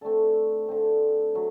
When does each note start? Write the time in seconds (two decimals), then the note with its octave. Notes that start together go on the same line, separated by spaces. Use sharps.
0.01 D3 A3 C4 A4
0.68 D3 A3 C4
1.35 F#3 A3